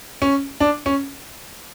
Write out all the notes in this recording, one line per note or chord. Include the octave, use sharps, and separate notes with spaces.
C#4
D4
C#4